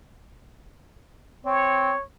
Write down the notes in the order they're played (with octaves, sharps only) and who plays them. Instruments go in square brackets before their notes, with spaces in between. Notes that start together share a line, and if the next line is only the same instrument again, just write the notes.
[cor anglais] C4 [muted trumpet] C#5